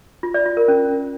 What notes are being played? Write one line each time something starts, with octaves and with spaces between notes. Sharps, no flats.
F4
D5
F4
A#4
C#4